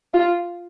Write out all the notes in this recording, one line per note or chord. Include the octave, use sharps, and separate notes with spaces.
F4